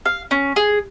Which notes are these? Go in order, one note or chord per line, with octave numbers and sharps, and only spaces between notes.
F5
C#4
G#4